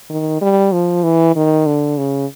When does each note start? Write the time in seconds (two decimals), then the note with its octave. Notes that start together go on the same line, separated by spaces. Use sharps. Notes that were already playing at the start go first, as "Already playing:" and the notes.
0.10 D#3
0.41 G3
0.72 F3
1.03 E3
1.36 D#3
1.67 D3
1.98 C#3